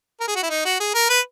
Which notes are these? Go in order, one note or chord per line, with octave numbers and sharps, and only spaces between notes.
A#4
G#4
F#4
E4
D#4
F#4
G#4
A#4
B4